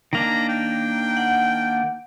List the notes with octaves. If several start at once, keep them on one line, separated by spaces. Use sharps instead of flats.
D#3 A#3 D4 A#5
G5
F#5